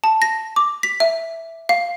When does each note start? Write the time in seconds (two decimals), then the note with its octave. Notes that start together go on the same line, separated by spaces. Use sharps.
0.04 A5
0.22 A#6
0.56 D6
0.83 B6
1.00 E5
1.69 F5